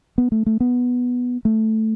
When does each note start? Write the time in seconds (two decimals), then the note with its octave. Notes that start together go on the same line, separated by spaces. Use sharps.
0.18 B3
0.32 A3
0.46 A3
0.60 B3
1.45 A3